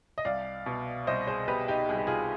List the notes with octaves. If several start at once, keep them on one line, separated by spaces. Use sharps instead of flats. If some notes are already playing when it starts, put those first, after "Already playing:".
D#5
C2 D5 F5
B2
C2 C5 D#5
G#4 C5
B2 G4 B4
D#4 G4
C2 G#4
G4
F4 G#4